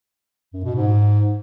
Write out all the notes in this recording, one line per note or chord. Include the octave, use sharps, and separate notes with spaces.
F#2
B2
G#2